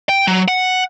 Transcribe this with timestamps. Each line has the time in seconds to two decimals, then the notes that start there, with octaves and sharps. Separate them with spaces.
0.09 G5
0.27 F#3
0.48 F#5